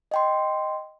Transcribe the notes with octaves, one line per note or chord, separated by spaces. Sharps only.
D#5 G5 C6